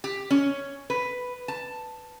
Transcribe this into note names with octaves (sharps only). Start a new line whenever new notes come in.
G4
C#4
B4
A5